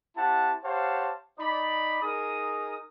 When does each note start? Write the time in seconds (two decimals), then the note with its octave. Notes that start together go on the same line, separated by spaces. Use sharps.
0.17 C4 E4 G4 F#5 A5
0.65 G4 C5 C#5 F5 F#5 A5
1.39 D#4 D5 B5
2.02 D#4 G#4 A#4 D#6